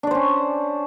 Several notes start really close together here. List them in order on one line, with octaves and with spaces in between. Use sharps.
D4 D5 C5 C#4